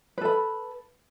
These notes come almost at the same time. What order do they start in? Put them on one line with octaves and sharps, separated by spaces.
B4 A4 B5